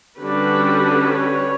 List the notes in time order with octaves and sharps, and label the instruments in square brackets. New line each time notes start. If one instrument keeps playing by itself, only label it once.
[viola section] D3 G3 C#4 F#4 B4 [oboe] D4
[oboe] C#5